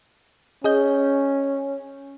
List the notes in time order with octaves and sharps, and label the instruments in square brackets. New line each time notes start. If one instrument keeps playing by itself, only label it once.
[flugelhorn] C#4 [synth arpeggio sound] G#4 D#5 G6